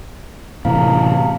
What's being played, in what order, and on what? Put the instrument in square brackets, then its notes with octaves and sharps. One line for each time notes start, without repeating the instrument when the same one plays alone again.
[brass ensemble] F#2 A5 A#5 [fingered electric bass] A2 C3 E3 [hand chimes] F5